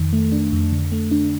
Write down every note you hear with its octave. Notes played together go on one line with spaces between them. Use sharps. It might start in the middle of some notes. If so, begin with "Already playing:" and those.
Already playing: F2 D#3
A3
D4
F2
D3
A3
D4